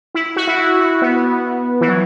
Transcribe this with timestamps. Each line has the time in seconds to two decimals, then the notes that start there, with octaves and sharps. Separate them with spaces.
0.15 E4
0.36 F#4
0.47 E4
0.80 F#4
1.02 B3
1.81 E3
1.88 F#3